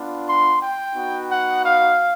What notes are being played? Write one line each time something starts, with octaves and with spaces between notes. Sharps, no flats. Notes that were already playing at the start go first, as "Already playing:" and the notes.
Already playing: B3 D4 F4
C6
G5
B3 D#4 F#4
F#5
F5